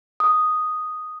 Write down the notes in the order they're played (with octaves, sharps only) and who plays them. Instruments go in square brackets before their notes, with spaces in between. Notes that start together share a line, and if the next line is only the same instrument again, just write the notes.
[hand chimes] D#6